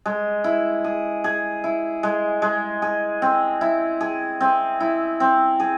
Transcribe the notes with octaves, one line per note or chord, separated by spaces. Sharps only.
G#3
E4
G#4
G#4
E4
G#3
G#3
G#4
C4
E4
G#4
C4
E4
C4
G#4